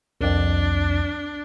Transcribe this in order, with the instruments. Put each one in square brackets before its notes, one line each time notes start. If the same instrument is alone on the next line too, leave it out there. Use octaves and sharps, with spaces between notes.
[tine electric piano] C2 F2 [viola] D4